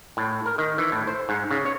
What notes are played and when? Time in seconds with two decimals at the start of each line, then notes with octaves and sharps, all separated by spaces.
0.17 A2
0.46 A#4
0.58 D#3
0.78 E3
0.92 A2
1.07 C5
1.29 G#2
1.51 C#3
1.65 C#5